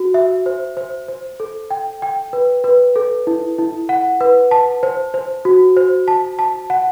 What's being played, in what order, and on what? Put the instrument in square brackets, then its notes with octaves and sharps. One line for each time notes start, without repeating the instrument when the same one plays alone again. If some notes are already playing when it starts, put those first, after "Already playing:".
Already playing: [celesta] F#4
E5
C5
C5
C5
A4
G5
G5
B4
B4
A4
E4
E4
F#5
B4
A5
C5
C5
F#4
C5
A5
A5
F#5